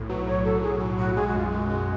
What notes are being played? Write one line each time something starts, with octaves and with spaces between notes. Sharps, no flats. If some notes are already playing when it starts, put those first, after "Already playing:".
Already playing: B1 A2
F#3 B4
A2 C#5
F#3 A4
F#3 G#4
F#3
B1 F#4
G#3 G#4
F#4
F#2 F4
G#3 F#4
G#3